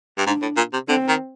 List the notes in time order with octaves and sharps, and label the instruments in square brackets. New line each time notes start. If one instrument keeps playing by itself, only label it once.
[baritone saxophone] G2
[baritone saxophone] G#2 [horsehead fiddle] D4
[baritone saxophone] A2
A#2
C3
[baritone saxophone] D3 [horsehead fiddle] C4
[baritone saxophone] D#3